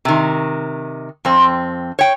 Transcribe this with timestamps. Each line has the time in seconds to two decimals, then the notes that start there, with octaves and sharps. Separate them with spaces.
0.05 C3 D#3
1.25 F2 C4
1.99 C#5 G5